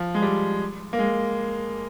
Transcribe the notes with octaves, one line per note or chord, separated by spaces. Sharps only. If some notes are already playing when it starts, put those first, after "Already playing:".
Already playing: F3
G#3
G3
A#3
G#3